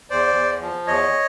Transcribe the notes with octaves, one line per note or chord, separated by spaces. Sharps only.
E2 C5 D5
E2
F3
E2 C#5 D#5